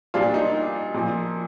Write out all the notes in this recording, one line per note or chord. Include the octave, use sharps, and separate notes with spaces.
A#2 G3 D4 F4
D#4
A#2 F3